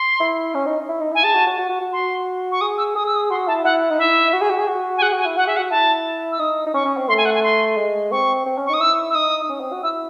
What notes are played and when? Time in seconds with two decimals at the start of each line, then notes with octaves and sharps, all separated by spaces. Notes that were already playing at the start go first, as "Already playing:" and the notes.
Already playing: C6
0.20 E4
0.55 C#4
0.66 D#4
0.89 E4
1.01 D#4
1.12 E4 G#5
1.23 G#4 A5
1.35 F#4
1.46 F#4
1.58 F#4
1.69 F#4
1.81 F#4
1.93 C6
2.52 C#6
2.61 G#4 D#6
2.78 E6
2.95 G#4 D#6
3.06 E6
3.16 D#6
3.30 F#4 C6
3.47 E4 A5
3.64 E4 F#5
3.91 D#4
3.98 E4 E5
4.33 F#4
4.41 G#4
4.50 F#4
4.59 G#4
4.68 F#4
4.97 G#5
5.02 G#4 F#5
5.13 F#4
5.20 G#5
5.25 E4
5.37 F#4 F#5
5.47 G#4 E5
5.57 F#5
5.59 F#4
5.71 E4 A5
6.32 E6
6.40 D#4 D#6
6.66 D#4
6.74 C#4 C#6
6.85 C#4
6.97 C4
7.08 A3 C6
7.18 G#5
7.25 F#5
7.34 G#5
7.43 C6
7.77 G#3
8.11 C4 C#6
8.46 C4
8.58 C#4
8.66 C#6
8.69 D#4 D#6
8.81 E4 E6
9.10 E6
9.15 D#4 D#6
9.43 D#4
9.49 C#4
9.60 C4
9.72 F#4
9.83 E4 E6